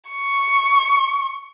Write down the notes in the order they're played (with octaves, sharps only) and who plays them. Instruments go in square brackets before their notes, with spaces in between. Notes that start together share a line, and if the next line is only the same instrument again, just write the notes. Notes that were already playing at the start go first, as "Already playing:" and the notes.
[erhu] C#6